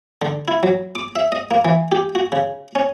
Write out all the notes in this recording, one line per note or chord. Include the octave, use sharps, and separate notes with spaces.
D3
E4
F#3
D6
E5
D#5
A#3
E3
G4
F#4
C#3
C#4